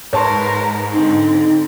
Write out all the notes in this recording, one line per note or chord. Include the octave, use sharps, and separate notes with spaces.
G#2 A#4 B4 C#5 A5 C6
D3 C4 D#4